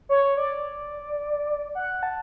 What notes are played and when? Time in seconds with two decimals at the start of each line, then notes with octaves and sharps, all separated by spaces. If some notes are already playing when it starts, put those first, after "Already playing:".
0.09 C#5
0.37 D5
1.75 F#5
2.03 A5